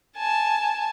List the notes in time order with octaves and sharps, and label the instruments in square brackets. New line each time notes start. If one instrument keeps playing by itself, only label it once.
[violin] G#5 A5